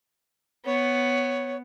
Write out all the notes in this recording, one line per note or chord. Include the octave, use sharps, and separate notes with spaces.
B3 C#5